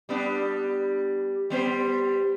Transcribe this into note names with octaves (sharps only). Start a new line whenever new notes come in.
G3 B3 D4
G3 B3 C5